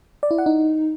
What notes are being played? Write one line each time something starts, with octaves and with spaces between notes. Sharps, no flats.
D5
E4
F#5
D#4